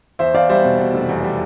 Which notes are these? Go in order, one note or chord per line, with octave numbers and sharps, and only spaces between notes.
E2 C5 E5
E2 D5 F5
G3 C5 E5
B2
B2
F1
E2
G3